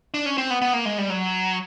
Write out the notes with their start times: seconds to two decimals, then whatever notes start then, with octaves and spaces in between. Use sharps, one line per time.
0.14 D4
0.26 C#4
0.38 C4
0.50 B3
0.62 B3
0.73 A#3
0.85 G#3
0.98 G3
1.10 F#3